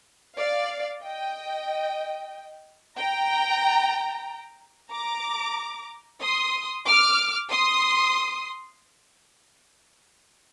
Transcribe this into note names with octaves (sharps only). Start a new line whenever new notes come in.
D5 F5
D#5 G5
G5 A#5
A#5 D6
C6 D#6
D6 F6
C6 D#6